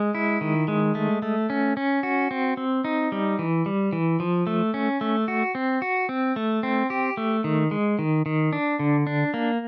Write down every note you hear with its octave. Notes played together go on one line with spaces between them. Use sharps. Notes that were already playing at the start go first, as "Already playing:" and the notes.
Already playing: G#3
E4
D#3
G#3
A3
A3
C#4
C#4
F#4
C4
C4
D#4
G3
E3
G3
E3
F3
A3
C#4
A3
F#4
C4
F#4
C4
A3
C4
G4
A3
D#3
G#3
D#3
D#3
D4
D3
D4
A#3